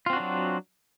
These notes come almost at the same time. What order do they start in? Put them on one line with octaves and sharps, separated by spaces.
F4 C4 F#4 D4 F#3